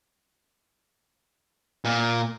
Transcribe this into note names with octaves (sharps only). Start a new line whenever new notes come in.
A#2